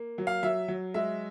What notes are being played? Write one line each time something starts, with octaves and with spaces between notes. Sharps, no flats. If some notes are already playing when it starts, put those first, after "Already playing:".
Already playing: A#3
F#3
F5
F#3 E5
F#3
G#3 E5